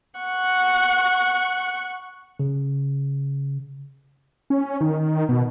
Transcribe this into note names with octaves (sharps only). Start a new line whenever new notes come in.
F#5 C#6
C#3
C#4
D#3
B2